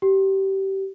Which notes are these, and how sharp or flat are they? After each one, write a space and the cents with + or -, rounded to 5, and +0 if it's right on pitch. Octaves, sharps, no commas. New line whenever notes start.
G4 -20